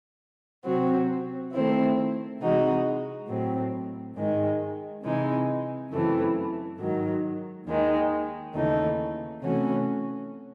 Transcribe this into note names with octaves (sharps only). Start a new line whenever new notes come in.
C3 F#3 C4 F#4
D#3 A3 C4 E4
C3 E3 G#3 D#4 F#4
A2 F#3 C4
G#2 D#3 G#3
C3 E3 G#3 D#4
F#2 C#3 E3 A3 C4
G#2 D#3 F#3
D#2 D#3 G#3 D#4
D#2 C#3 E3 A3 D#4
C3 E3 A3 C#4 F#4